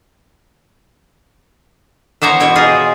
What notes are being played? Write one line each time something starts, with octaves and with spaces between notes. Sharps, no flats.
E3 B3 C5 C#5 A#5
B2 E4 C#5 G5
D#4 F4 G#4 G#5